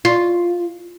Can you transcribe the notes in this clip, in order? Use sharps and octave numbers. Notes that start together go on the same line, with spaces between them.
F4